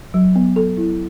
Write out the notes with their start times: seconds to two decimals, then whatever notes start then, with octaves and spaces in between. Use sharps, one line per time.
0.14 F#3
0.36 B3
0.56 A4
0.77 E4